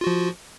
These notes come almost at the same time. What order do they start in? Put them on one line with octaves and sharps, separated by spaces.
F4 F#4 F3